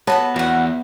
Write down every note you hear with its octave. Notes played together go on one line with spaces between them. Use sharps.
B3 F#4 A4 B4 C#5 A5
E2 F#4 F#5